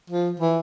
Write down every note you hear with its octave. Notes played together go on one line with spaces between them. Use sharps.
F3
E3